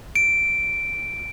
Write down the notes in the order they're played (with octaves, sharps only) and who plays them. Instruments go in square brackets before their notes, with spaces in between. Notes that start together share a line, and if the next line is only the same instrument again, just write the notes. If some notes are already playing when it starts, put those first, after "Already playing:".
[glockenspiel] D7